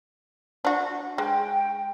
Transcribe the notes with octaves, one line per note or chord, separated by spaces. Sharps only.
D4 F#4
G#3 G5